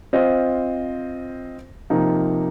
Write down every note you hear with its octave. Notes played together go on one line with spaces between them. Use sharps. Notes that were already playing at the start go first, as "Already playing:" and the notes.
C4 F4 C5 D#5
C3 F3 A#3 D#4